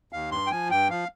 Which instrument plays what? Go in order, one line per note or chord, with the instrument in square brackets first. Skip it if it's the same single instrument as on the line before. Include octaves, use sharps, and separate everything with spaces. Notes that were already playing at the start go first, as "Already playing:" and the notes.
[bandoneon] D#2 F5
G2 C6
G5
F3 G#5
G2 G5
F3 F5